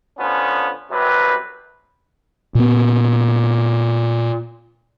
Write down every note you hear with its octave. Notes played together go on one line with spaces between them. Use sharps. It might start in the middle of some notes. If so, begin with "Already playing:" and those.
D3 F3 B3 C#4
C2 F#2 C3 B4
A#2 B3